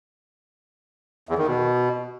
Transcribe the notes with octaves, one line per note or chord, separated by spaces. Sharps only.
E2
D#3
B2